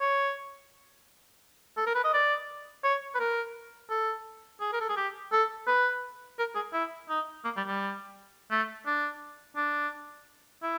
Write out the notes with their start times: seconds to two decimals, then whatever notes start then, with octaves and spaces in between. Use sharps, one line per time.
0.01 C#5
1.77 A4
1.87 A#4
1.95 B4
2.04 D#5
2.14 D5
2.84 C#5
3.15 B4
3.20 A#4
3.90 A4
4.61 G#4
4.73 A#4
4.81 A4
4.89 G#4
4.97 G4
5.32 A4
5.67 B4
6.39 A#4
6.55 G#4
6.73 E4
7.09 D#4
7.45 A#3
7.57 G3
7.67 G3
8.51 A3
8.87 D4
9.56 D4
10.63 E4